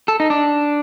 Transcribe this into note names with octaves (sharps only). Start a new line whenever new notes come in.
A4
D#4
D4